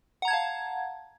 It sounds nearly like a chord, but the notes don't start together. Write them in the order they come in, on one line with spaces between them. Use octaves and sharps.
F#5 A#5 G#6 A5 F5